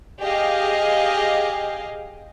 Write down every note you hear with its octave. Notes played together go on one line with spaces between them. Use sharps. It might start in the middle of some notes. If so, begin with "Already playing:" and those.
G4 G#4 D#5 F5